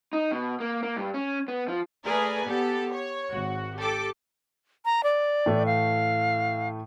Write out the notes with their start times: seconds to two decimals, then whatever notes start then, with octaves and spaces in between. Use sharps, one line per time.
0.13 D#4
0.32 B2
0.60 A#3
0.83 A#3
0.97 G2
1.14 C#4
1.48 B3
1.68 F3
2.04 A3 G#4 A#4 B4 D5 G#5
2.45 B3 G4 A4
2.93 C#5
3.31 G#1 F#4
3.78 G4 A4 D6
4.85 A#5
5.03 D5
5.46 A2 E3 A3
5.66 F5